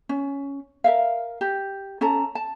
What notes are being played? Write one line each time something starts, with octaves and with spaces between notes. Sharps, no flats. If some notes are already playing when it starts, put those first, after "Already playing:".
C#4
A#4 E5 F5
G4
C#4 A4 A5 A#5
A5